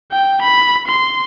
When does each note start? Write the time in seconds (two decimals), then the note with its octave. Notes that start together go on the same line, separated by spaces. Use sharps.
0.11 G5
0.42 B5
0.87 C6